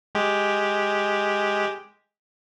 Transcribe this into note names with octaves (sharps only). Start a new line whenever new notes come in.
G#3 G4